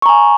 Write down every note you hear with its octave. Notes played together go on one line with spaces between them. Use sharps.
G#5 A#5 C#6